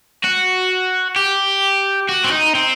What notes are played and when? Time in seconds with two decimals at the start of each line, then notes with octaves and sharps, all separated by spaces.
0.25 F#4
1.16 G4
2.09 F#4
2.24 C4
2.31 D#4
2.55 C4